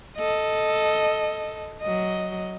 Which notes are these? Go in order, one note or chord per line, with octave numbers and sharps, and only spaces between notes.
A4 D#5
F#3 D#5